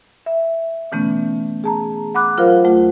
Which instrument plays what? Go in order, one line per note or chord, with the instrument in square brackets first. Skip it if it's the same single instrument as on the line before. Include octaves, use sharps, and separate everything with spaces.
[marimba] E5
B2 D3 E3 A3 B3 C#4
G#4 A5 A#5
F#5 B5 D6 F#6
F#3 F4 A#4 C5 F5
D#2 A3 F4 F#5